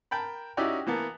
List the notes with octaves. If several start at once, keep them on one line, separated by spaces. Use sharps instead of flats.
A#4 G5 A5 B5
C#4 D#4 E4 F#4 G4 D5
E3 A#3 B3 A5